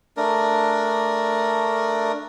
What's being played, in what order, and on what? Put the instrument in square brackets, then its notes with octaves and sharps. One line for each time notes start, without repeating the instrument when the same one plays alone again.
[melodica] A3 D4 A#4